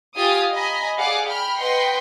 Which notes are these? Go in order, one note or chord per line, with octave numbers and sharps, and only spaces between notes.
F4 G4 F5 G#5 D#6
D#5 G#5 A#5 B5
G#4 D5 F5 F#5 D6
G5 B5 F6
B4 D#5 F#5 G5 C6